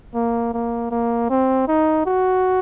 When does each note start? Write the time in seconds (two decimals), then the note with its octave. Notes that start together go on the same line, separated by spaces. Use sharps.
0.14 A#3
0.54 A#3
0.91 A#3
1.30 C4
1.68 D#4
2.06 F#4